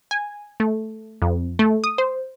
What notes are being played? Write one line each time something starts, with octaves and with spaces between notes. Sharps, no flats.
G#5
A3
F2
A3
D#6
C5